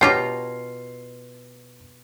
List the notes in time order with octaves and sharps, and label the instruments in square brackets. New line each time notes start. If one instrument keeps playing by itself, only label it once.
[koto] B2 F4 A#5 [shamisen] G4 C#5 [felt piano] C7